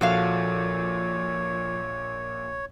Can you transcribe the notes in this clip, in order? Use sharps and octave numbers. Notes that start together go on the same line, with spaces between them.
A#1 A#2 F3 F#4 A4 C#5 F5